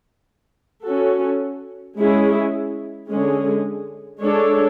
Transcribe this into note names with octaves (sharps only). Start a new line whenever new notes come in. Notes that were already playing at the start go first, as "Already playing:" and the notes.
C#4 F#4 A4
G#3 C#4 E4 G#4
D3 G#3 C#4 G#4
G#3 D4 A4 C#5